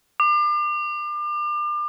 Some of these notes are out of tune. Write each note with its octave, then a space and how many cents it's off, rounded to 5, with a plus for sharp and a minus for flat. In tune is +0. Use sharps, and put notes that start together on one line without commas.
D6 +35